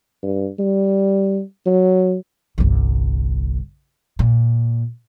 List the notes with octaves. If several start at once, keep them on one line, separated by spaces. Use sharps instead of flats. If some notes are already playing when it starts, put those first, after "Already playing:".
G2
G3
F#3
G1 C2
A#2